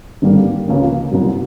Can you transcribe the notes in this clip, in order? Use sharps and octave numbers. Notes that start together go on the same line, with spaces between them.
G#1 G2 D3 G3 A#3
C#2 C#3 F3 A#3 C#4
C2 B2 F#3